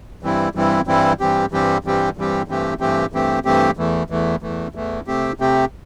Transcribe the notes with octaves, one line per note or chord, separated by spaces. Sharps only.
G2 E3 G3 C4 E4
G2 E3 G3 C4 E4
G2 E3 G3 C4 E4
G2 E3 G3 C4 G4
G2 E3 G3 C4 G4
G2 E3 G3 C4 G4
G2 E3 G3 C4 G4
G2 E3 A3 C4 G4
G2 E3 A3 C4 G4
G2 E3 A3 C4 G4
G2 E3 A3 C4 G4
E2 E3 A3
E2 E3 A3
E2 E3 A3
E2 E3 A3
C3 A3 C4 G4
C3 A3 C4 G4